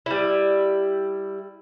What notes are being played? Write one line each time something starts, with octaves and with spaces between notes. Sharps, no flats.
G3 E4